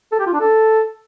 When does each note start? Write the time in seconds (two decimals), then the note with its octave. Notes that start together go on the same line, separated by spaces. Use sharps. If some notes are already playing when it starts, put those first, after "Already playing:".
0.12 A4
0.19 G4
0.26 F4
0.33 D4
0.40 A4